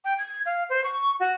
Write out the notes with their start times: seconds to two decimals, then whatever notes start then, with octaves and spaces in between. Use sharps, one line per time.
0.04 G5
0.18 G#6
0.45 F5
0.69 C5
0.83 C#6
1.19 F#4